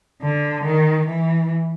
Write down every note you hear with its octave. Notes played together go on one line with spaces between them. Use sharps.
D3
D#3
E3